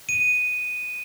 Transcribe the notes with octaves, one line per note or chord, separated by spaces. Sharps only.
D#7